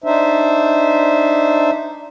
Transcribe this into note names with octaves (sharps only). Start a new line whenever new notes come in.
D4 D#4 C5 E5